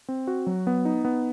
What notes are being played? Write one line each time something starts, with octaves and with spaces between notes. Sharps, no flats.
C4
F#4
F#3
B3
D#4
B3